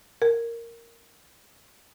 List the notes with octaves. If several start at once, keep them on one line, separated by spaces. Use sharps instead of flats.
A#4